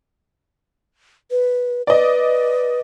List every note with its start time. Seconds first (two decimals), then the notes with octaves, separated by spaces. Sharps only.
1.31 B4
1.87 B4 D5 D#5